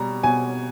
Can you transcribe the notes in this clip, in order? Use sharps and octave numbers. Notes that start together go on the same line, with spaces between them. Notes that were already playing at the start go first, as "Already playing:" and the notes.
Already playing: B2 G3 A#5
B2 G#5